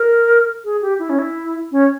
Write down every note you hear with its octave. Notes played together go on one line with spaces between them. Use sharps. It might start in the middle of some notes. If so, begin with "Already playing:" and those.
Already playing: A#4
G#4
G4
E4
C#4
E4
C#4